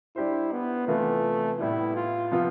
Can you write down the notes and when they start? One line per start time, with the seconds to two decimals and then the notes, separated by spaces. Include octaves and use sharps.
0.16 G3 D4 E4 G4 C5
0.52 B3
0.87 C3 E3 A3 B3 F4
1.59 A2 G3 B3 E4
1.95 F4
2.31 C3 F3 B3 F4